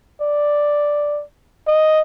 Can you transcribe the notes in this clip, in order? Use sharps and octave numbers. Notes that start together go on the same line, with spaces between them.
D5
D#5